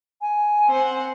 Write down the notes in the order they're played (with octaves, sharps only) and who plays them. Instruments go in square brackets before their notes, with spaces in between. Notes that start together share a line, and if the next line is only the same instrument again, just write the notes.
[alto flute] G#5
[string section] C4 C5 F#5